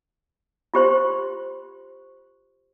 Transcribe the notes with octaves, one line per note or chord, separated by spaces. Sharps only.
F4 G4 C5 C6